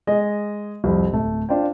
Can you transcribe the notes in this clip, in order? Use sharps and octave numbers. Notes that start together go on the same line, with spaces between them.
G#3 G#4 D#5
C2 F2
D1 A3
D4 F4 C5 G5